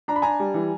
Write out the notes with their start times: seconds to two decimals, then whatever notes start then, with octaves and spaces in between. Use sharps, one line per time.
0.08 D4 A#5
0.16 B5
0.22 D4 G#5 A#5
0.40 G3
0.54 E3